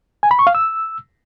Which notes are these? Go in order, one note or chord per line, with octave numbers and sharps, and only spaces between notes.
G#5
B5
C#6
F5
E6